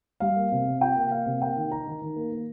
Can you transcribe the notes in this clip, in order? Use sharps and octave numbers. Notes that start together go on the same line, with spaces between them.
G3 F5
A#3
C3
C3
F4 G5
A#3
A#3 F5
C3
A#3 G5
D#3
D#4 A#5
D#3
D#3
A#3
A#3